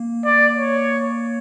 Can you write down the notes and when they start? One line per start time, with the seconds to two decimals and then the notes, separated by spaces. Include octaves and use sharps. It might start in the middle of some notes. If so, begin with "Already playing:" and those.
Already playing: A#3
0.25 D5
0.56 C#5